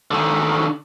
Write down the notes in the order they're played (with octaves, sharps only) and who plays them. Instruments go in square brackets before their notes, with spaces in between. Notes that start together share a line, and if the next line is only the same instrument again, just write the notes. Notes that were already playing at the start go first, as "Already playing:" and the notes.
[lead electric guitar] D3 D#3